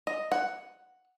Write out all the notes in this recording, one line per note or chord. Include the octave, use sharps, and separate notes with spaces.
D#5
F#5